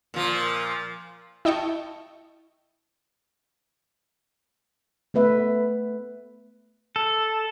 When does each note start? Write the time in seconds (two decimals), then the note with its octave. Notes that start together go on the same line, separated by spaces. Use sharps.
0.14 A#2 F3
1.45 E4 D#5 G5 A5 C#6
5.14 A3 B3 B4 E5
6.96 A4